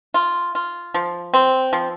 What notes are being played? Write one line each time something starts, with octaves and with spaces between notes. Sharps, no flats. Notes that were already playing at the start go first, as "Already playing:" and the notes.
F4
F4
F3
C4
F3